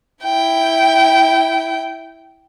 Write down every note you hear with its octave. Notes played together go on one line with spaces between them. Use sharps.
E4 G5